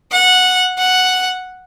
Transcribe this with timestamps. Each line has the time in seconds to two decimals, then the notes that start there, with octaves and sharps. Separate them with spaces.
0.12 F#5
0.79 F#5